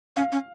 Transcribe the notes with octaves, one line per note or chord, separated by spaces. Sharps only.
C#4 F5
C#4